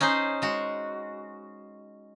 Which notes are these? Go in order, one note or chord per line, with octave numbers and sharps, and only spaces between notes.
C#4 D#4 G#4 C5
G#3 F#4